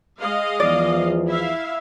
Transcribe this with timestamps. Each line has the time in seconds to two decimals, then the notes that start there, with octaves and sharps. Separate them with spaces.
0.20 G#3 D#5 F5
0.60 E2 F3 D5
1.28 E4 E5 F5